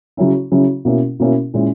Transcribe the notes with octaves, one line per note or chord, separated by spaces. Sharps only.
C#3 F#3 C#4 E4
C#3 F#3 C#4 E4
B2 A#3 C#4 E4
B2 A#3 C#4 E4
A#2 G#3 C#4 E4